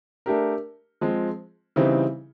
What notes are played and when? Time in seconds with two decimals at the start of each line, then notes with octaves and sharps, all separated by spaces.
0.26 A3 D4 G4 A#4
1.01 F3 G#3 C4
1.76 C#3 E3 G3 C4 D#4